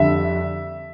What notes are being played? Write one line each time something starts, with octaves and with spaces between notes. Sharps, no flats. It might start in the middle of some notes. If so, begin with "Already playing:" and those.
Already playing: F2 D3 G3 E5